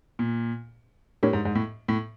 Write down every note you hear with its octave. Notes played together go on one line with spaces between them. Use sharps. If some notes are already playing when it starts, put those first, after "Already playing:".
A#2
A2 D4 G4 A#4 C#5
G#2
G#2
A2
A2